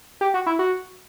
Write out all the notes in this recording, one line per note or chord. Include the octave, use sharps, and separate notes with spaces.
G4
F#4
E4
F#4